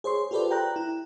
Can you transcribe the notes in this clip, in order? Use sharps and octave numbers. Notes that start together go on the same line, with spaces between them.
G#4 C5 C#5 C6
F4 G4 A4 B4 C5 D5
G5 A#5 F#6
E4